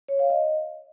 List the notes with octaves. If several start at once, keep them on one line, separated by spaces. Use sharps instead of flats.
C#5
F5
D#5